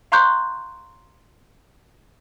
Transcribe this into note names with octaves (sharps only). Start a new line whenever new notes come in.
F5 A#5 C6 C#6 F#6 G6